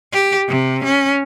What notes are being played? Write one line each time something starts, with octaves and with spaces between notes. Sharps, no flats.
G4
C3
C#4